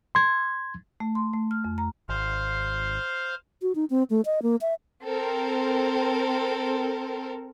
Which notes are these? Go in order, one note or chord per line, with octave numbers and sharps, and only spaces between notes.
C6 G#6
A3
C6
A3
F6
F2
A#5
G#1 C5 F5
F#4
D#4
C4
A3
D#5
A#3
E5
C4 A4 A#4